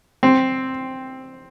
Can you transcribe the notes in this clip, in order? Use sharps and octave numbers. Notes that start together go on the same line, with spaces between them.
C4